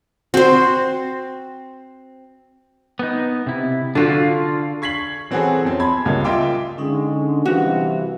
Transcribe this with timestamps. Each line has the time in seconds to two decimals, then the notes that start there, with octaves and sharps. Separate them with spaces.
0.34 C4 F#4 C5
2.99 B3 D#4
3.46 C3 E4
3.95 D3 D4 F4 F#4
4.82 C#6 G#6 B6 C7 F#7
5.31 E3 C4 C#4 F#4 G#4 A4
5.65 F2 C4 C#4
5.80 A5 B5 C6 G#6
6.05 C#2 G2 C#3 A#3
6.24 F4 D#5 E5 G5 C6 D6
6.78 D3 G#3 C#4 D#4
7.46 C2 C3 E3 F#4 F5